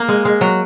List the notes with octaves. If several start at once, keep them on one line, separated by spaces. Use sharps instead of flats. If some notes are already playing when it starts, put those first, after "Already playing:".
Already playing: A#3
G#3
G#3
F#3